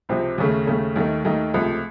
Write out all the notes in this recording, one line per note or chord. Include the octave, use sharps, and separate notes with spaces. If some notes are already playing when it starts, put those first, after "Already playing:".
C#2 C3 F3 C4
D#2 C#3 A3
D#2 C#3 A3
D#2 D#3 A3 D#4
D#2 D#3 A3 D#4
C#2 C3 F3 A3